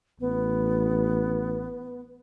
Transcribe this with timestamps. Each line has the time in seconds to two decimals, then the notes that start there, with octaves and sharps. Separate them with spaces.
0.20 A1 B3